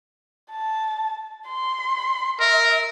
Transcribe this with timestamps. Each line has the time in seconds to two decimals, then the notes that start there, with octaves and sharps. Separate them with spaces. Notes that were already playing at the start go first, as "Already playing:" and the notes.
0.51 A5
1.47 C6
2.40 A#4 E5